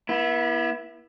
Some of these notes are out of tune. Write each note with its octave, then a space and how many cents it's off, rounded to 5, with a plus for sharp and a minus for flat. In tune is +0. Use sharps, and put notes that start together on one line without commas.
B3 -40 E4 +0